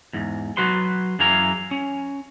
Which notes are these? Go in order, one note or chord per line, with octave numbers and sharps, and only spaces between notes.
E2 G#2
F#3 F#4 B4 C6
F#2 E3 G#4 F5 A#5
C#4